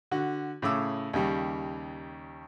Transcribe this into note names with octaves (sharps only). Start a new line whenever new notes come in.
D3 F#4
A2 C#3 D6 E6
D#2 C#3 G3